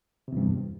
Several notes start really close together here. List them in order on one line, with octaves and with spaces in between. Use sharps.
C3 E2 G2